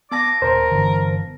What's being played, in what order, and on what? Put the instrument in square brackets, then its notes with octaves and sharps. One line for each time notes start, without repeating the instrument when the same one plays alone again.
[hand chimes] B3 A5 A#6 [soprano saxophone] D6
[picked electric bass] D#1 [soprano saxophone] A#4 [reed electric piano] C5
[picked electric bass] G1 D3 E3